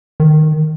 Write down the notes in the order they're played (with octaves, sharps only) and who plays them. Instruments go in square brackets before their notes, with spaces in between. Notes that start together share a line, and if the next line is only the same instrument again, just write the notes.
[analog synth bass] D#3